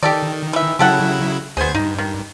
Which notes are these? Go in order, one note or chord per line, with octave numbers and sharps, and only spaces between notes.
D#3 G4 A4 D5
E3 E5
C#3 F#3 E4 G4 A4 F#5
D2 B3 G#4 C5 G#6
G2 D#4
D#3